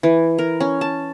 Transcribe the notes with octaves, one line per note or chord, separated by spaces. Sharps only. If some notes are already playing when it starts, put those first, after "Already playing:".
E3
A#4
C#4
A5